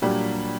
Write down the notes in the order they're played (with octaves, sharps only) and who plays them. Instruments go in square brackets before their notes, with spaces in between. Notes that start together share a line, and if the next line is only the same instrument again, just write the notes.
[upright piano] A#2 F#3 A#3 D4 [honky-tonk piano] G3